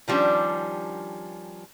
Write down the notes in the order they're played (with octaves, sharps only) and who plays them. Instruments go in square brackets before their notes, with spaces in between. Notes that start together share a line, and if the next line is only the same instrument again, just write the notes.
[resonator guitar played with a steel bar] D#3 F3 G3 B3 C#4 D4